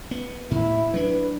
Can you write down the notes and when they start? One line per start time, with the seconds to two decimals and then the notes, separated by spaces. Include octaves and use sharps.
0.11 B3
0.51 A2 E4
0.94 F#3 D4 B4